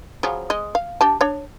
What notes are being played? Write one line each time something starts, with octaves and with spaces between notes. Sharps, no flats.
C#3 F3 F#3
G#3 D#5
F5
D4 G4 A5
D4 C#5